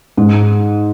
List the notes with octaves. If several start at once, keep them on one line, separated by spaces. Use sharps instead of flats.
G#2